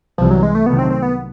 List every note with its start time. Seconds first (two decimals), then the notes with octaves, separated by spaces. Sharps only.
0.18 C2 C3 E3 F3 G3
0.31 F#3
0.43 G#3
0.55 A3
0.66 C2 C3 D#3 F#3 A3 B3
0.79 C4
0.90 C4
1.02 B3